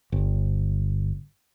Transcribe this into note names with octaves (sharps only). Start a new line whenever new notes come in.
G1